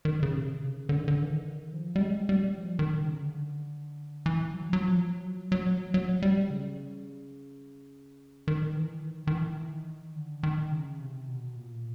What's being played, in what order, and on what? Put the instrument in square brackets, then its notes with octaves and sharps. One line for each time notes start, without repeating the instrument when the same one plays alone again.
[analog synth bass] D#3
C#3
C3
C#3
D3
D#3
D3
E3
D#3
F3
G3
G#3
G3
F3
D#3
C#3
D3
E3
F#3
F#3
F3
F#3
F#3
F#3
G3
C#3
D#3
E3
D#3
D#3
E3
D#3
D3
D#3
C#3
C3
B2
A#2